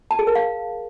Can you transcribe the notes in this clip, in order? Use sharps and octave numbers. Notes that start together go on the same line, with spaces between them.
A5
G#4
A#4
F5